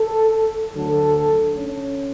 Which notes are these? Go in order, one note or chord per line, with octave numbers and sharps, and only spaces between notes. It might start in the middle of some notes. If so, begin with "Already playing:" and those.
Already playing: A4
D2 D3 F#3 A4
C#4